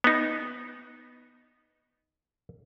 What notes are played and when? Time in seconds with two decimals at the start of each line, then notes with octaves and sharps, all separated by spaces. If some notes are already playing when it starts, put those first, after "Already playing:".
0.04 B3 D#4